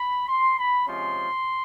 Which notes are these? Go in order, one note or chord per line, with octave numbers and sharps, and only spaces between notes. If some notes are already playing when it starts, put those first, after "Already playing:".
Already playing: B5
C6
B5
C3 F3 G#3 C#4 C6